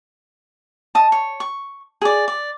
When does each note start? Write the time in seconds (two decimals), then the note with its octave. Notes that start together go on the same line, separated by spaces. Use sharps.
0.95 D#5 A5
1.12 C#5
1.40 C#6
2.02 G#4 D5
2.28 D5